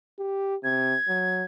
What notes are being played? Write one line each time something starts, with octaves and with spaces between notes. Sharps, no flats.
G4
C3 G#6
F#3